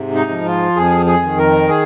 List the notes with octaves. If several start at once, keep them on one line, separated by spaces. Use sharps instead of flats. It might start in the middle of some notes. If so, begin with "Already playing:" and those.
Already playing: G#2 C3
D#4
F3
F4
F2 G#4
G#4
D#3
A#4
G#4